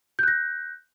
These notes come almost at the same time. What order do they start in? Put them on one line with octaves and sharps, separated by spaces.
G6 F#6 A#6